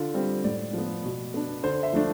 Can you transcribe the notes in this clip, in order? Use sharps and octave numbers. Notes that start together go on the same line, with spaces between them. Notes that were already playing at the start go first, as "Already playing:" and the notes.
Already playing: D3 F4
G3 C4
A2 D5
F3 B3
B2
B3 D4
D3 C5
E5
F3 A3 D4